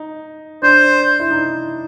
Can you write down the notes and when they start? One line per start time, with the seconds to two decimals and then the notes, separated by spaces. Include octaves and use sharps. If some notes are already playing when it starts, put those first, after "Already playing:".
Already playing: D#4
0.63 D4 C5
1.20 E4
1.31 D#4